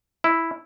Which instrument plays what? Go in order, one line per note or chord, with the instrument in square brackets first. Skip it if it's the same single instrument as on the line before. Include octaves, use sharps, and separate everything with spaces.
[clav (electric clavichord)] E4